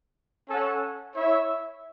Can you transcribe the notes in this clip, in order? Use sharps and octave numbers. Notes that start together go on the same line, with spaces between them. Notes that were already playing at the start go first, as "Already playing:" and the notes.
C#4 A4 C#5 F#5
E4 C#5 E5